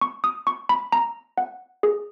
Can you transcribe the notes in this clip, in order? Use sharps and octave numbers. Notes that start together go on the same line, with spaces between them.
C#6
D#6
C#6
B5
A#5
F#5
G#4